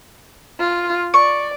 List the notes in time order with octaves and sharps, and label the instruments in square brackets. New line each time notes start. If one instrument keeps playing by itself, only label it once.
[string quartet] F4
[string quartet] D5 [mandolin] C#6